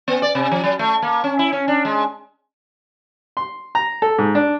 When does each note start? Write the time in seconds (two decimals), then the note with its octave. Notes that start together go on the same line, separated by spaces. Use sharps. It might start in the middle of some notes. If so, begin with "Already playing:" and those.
0.08 B3
0.22 D5
0.35 C3
0.51 F3
0.64 F#3
0.79 A3
1.02 A#3
1.24 C#4
1.39 E4
1.53 C#4
1.68 D4
1.85 G#3
3.37 C6
3.75 A#5
4.02 A4
4.18 G#2
4.35 D4